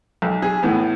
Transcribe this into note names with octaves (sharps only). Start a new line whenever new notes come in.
B1
G#4
A2 E3 B3